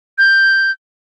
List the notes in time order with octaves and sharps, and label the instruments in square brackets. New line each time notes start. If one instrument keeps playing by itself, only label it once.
[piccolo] G6